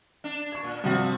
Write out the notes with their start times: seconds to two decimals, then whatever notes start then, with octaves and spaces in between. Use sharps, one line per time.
0.24 D4
0.52 C#6 G#6
0.64 A#2
0.84 G2 C3 F3 F#4